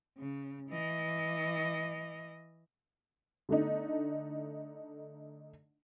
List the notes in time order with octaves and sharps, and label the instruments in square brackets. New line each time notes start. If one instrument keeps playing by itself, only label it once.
[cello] C#3
E3 D#5
[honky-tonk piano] D3 A3 D4 D#4